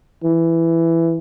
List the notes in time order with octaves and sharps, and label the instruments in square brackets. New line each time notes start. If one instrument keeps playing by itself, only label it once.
[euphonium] E3